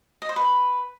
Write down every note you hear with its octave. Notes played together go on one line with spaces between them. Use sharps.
D#5
C5
B4